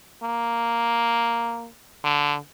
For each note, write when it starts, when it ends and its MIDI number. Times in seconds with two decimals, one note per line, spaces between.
0.23 1.68 58
2.04 2.36 50